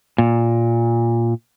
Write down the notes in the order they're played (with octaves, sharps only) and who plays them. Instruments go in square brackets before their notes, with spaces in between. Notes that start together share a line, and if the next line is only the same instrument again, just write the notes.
[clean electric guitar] A#2